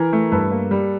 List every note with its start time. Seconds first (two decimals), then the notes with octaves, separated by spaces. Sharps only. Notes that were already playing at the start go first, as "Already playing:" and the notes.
Already playing: E3 A#4
0.13 A3
0.32 G2 A4 B4
0.52 A#3
0.71 G3